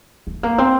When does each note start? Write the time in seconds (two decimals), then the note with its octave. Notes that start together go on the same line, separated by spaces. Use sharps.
0.27 A3
0.43 A#3
0.58 C4